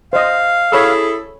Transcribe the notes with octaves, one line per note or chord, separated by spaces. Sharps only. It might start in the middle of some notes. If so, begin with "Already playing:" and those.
C5 D#5 F5
E4 G#4 A4 C#5 B5 E6